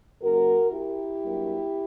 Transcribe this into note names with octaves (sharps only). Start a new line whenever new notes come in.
F#2 C#3 F#3 A#3 F#4 A#4
E4 G4
G2 F#3 A#3